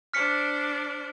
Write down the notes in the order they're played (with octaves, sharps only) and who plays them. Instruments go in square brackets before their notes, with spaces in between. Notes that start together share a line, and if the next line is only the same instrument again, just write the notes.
[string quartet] D4 C5 D5 [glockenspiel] F6 B6 C#7